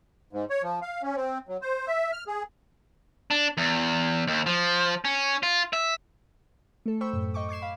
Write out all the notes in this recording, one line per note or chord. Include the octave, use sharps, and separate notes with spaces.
G#2
C#5
F3
F5
C#4
C4
F#3
C5
E5
F6
G#4
D4
E2
D#2
F3
C#4
F4
E5
A3 A4
C5 G5 B5 C#6 E6
F#2 A2
D#5 G5 C#6 D6
D6 G#6 C7 E7
F5 B5